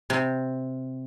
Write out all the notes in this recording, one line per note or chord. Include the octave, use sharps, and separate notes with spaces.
C3